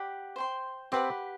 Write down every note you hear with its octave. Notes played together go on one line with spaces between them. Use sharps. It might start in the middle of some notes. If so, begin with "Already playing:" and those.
Already playing: G4 D5 F#5 B5
C5 G5 C6
C4 G4 B4 F#5 B5